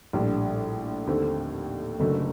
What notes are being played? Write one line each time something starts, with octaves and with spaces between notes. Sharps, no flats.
A#1 A2 G3 D4
D#2 D3 A3 C4
F#1 F#2 D3 A3